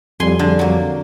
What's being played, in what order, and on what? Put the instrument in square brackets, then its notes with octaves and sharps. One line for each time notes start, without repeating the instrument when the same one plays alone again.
[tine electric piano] F2 G3 [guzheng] G#5 C6
[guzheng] D3
F#3 A#3